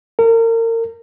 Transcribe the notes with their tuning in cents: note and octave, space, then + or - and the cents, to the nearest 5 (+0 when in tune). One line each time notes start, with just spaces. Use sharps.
A#4 -35